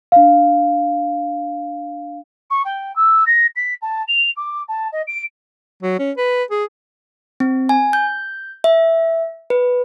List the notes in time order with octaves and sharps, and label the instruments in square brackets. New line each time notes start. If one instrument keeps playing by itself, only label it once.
[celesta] D4 F5
[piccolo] C#6
G5
E6
A#6
B6
A5
F7
D6
A5
D#5
D7
[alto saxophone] F#3
C#4
B4
G#4
[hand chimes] C4
G#5
G6
E5
B4